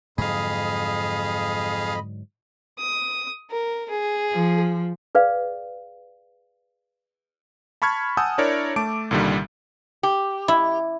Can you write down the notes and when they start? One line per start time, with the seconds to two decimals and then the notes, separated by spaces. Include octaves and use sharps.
0.18 F2 G#2 D3 F#3 G#4 D#5 F5 B5
2.79 D#6
3.50 A#4
3.89 G#4
4.33 F3
5.15 G#4 B4 D5 F5
7.82 A5 B5 C#6 F6 G#6
8.17 F#5 G#5 A5 D#6 E6 G6
8.38 D4 E4 A#4 C#5 D5
8.76 A3 A5 D6 D7
9.11 C2 A#2 D3 D#3 G3
10.03 G4
10.48 E4